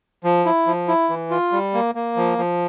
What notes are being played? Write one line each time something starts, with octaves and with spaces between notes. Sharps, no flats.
F3
E4
F3
E4
E3
F4
G3
A#3
A#3
F3
F3